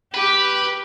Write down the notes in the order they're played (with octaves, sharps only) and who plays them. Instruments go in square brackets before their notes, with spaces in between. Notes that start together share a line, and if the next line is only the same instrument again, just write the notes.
[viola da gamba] G4 [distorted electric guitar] B4